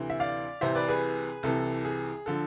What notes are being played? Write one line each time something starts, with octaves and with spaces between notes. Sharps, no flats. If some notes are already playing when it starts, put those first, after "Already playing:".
Already playing: D2 C3 E3
E5
D5 F5
C2 C3 E3 C5 E5
B4 D5
G#4 B4
C2 C3 E3 A4
G#4
D3 F3 A4